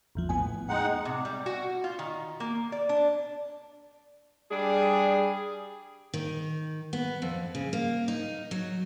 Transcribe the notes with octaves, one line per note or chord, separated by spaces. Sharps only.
A1 E2 F3
A2 B3 G#5
G#3 D#4 F#5 G5
C3
G3
F#4
F4
D#3
A#3
D5
D4
G3 D4 G#4
D#3
B3
F2
C#3
A#3
D#4
F#3